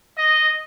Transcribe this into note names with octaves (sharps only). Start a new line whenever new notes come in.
D#5